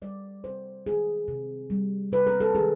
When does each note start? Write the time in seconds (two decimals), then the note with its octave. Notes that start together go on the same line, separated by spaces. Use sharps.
0.02 G3 D5
0.44 C3 C5
0.86 D#3 G#4
1.28 C3
1.70 G3
2.12 C3 B4
2.27 A#4
2.41 A4
2.54 D#3 G#4